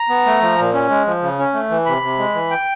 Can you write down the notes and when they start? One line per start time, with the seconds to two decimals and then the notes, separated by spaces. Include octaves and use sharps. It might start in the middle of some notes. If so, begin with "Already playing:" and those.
Already playing: A#5
0.09 B3
0.26 A3
0.41 F3
0.58 A#2
0.74 C#4
0.90 G#3
1.07 F3
1.22 C#3
1.39 C#4
1.54 A3
1.70 E3
1.86 C3 B5
2.02 C3
2.18 G#3
2.34 E3
2.51 G5